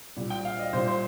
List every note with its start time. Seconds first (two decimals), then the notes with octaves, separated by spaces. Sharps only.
0.16 A#2 G3
0.30 G5
0.45 F5
0.59 D#5
0.73 A#2 G3 C5
0.88 C5